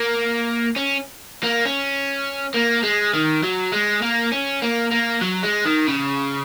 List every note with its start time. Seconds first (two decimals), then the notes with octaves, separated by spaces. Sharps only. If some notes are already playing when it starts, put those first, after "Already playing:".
Already playing: A#3
0.76 C#4
1.44 A#3
1.66 C#4
2.54 A#3
2.83 G#3
3.14 D#3
3.43 F#3
3.73 G#3
4.02 A#3
4.32 C#4
4.62 A#3
4.91 A#3
5.21 F#3
5.43 G#3
5.66 D#3
5.88 C#3